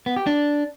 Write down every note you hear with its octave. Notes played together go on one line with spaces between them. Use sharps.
B3
G4
D4